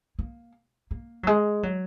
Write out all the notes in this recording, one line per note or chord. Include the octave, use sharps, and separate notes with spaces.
A#3
A#3
F#3
G#3
F#3